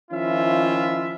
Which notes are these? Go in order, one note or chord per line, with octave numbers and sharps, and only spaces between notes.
D#3 F3 C#4 E4 F4 E5